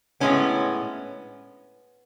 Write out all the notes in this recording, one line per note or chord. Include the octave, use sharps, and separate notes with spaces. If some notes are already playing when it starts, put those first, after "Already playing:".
A2 G#3 B3 C#4